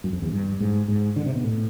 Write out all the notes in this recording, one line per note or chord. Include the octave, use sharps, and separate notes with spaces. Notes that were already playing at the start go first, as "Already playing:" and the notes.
F#2
F2
E2
G2
G#2
G#2
D3
C3
B2
A2